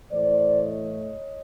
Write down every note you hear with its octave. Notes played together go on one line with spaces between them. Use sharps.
A2 E3 A3 C5 D5
C#5 D#5